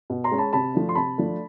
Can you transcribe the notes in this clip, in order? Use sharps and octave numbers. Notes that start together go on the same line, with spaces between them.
B2
A#5 C6
G#3 C#4
A5 B5
C3 A5 B5
F3 A3 D4
C6
C3 A5 B5
F3 A3 D4